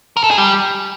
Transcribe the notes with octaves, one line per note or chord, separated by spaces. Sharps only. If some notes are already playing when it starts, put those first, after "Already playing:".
A#4
A4
G#4
G3